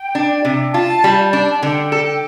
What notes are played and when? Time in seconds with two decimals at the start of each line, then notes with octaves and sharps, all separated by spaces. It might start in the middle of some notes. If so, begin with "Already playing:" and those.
Already playing: G5
0.15 D4
0.45 C3
0.74 F4 A5
1.04 G3
1.33 D4 A5
1.51 A5
1.63 D3 G5
1.92 A4